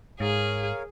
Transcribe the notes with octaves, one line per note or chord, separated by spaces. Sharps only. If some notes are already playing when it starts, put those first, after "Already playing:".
G#2 G#4 A#4 C#5 F5